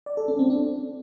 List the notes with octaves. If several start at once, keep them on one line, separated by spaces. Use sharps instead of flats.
D5
A4
C#4
C4
D4